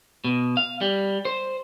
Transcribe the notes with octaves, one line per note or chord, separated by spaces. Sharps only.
B2
F5
G3
C5